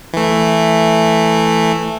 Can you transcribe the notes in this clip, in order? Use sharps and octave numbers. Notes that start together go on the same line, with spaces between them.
E3 A3